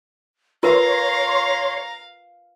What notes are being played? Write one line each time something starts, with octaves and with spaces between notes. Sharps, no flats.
F4 A#4 B4 C#5 F5 A#5 C6